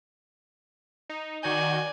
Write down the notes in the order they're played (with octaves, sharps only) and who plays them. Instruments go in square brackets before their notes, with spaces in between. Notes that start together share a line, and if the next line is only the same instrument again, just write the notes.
[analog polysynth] D#4
[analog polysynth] D#3 F#4 G6 [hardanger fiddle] D5 G#5